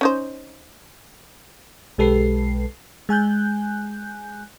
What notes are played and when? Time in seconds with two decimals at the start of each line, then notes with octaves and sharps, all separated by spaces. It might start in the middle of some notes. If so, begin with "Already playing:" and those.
0.01 C#4 D#4 C5
1.98 B1 G#3 G4 A4 B4 C7
3.09 G#3 G#5 F#6 G6